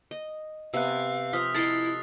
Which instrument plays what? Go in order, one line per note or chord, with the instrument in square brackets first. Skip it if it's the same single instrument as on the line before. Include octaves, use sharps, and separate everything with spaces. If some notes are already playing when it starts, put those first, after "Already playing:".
[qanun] D#5
[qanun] C3 B3 [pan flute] F5 [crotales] E6 F#6
[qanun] F3 C5 A#5 [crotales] D#6 F6 B6
[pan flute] E4 [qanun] A4 D#5 [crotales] A6 C7